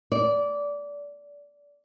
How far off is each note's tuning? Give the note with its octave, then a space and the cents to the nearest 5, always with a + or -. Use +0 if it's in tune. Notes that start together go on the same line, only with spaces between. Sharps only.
D5 -20